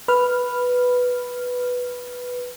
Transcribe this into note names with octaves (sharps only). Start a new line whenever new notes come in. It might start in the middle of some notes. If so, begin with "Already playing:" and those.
B4 F6